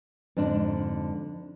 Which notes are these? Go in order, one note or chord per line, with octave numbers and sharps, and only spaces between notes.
F2 G#2 D3 D4